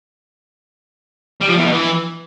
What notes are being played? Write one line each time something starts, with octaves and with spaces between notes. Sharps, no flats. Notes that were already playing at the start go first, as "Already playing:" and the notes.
G3
F3
E2
B2
E3